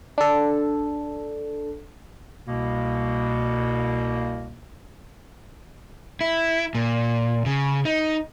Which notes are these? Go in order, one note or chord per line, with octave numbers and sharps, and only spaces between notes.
D4 A4
C2 B2 A#3
E4
A#2
C#3
D#4